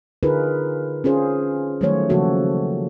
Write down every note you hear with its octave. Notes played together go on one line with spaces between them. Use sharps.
D3 D#4 F4 G#4 A#4 B4
C#4 F4 G#4 C5
D#3 F#3 G3 A3 C5 C#5
C#3 F3 A#3 F#4 A4